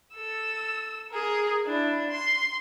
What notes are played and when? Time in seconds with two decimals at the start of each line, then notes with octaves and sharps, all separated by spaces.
0.16 A4 E6
1.11 G#4 A#4
1.66 D4 E4
2.10 C6